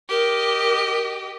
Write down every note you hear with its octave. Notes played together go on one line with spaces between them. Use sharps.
G4 A#4 D#5